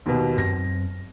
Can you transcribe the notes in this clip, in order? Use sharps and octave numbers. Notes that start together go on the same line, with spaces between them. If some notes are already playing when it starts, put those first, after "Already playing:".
D#2 B2
F#2 C4 A#6